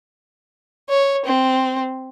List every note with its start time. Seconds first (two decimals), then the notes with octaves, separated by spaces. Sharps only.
0.89 C#5
1.26 C4